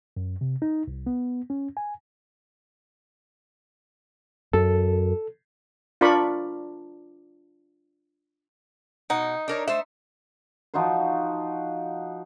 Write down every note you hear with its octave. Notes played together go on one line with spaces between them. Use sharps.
F#2
C3
D#4
C2
B3
C#4
G#5
F#2 A4
D4 F4 A#4 D5 B5 C#6
B2 D#4 F#5
D4 A#4 C#5
A3 C5 E5
F3 D#4 F#4 C5